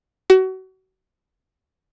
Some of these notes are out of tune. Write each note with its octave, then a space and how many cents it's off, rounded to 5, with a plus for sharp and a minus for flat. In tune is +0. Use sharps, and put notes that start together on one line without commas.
F#4 +30